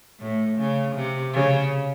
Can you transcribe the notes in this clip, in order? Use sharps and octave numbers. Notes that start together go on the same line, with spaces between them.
A2
C#3
C3
C#3